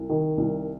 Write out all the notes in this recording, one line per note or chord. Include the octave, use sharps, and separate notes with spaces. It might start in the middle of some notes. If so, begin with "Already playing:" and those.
Already playing: C2
D#3
C2